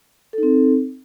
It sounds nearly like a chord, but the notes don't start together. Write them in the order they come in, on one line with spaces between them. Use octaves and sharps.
A4 D#4 C4